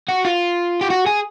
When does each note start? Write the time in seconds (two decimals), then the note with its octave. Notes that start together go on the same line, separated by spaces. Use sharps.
0.09 F#4
0.25 F4
0.81 G4
0.90 F#4
1.06 G#4